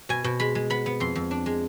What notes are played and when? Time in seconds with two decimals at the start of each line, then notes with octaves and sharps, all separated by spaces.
0.09 B2 G#5
0.24 B2
0.40 G#3 B5
0.55 G#3
0.70 B3 B5
0.86 B3
1.00 F2 C6
1.15 F2
1.31 D4
1.46 G#3